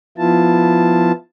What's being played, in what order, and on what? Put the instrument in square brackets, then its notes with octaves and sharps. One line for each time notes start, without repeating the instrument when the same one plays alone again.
[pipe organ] F3 B3 E4 F4 A5